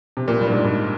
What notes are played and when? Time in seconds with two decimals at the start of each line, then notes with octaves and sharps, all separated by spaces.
0.17 C3
0.28 A#2
0.41 G2
0.48 A#2
0.52 G#2
0.64 G#2